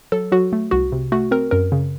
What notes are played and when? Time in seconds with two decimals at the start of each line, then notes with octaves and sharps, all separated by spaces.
0.12 F#3 A4
0.32 F#3 F#4
0.53 A3
0.71 C2 F#4
0.92 C3
1.12 A3 F#4
1.31 C4 A#4
1.51 F#2 A#4
1.72 C#3